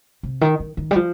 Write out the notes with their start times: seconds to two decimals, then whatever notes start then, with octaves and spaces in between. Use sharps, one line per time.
0.23 C3
0.41 D#3
0.60 D#3
0.77 D#3
0.91 G3
0.96 F3